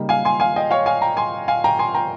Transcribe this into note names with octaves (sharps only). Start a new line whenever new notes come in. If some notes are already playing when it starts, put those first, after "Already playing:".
Already playing: C#3 G3 A#3 D#4
F5 G#5
G#5 C6
F5 G#5
D#5 G5
C#5 F5
F5 G#5
G5 A#5
G#5 C6
F5 G#5
G5 A#5
G#5 C6
G5 A#5